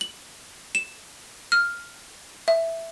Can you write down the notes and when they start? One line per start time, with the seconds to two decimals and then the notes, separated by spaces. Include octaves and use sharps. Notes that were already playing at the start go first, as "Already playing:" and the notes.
0.01 F#7
0.75 E7
1.52 F6
2.48 E5